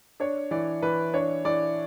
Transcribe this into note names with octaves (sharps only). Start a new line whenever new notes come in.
D4 C#5
E3 D5
E3 B4
D4 C#5
E3 D5